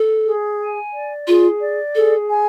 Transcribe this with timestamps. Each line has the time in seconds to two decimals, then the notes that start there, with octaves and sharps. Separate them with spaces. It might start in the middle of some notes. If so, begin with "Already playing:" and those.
Already playing: A4
0.26 G#4
0.60 G#5
0.94 D5
1.27 F4 G#4
1.62 D5
1.95 G#4 A4
2.29 G#5